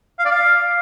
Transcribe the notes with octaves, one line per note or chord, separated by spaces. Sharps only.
F5
D5
F5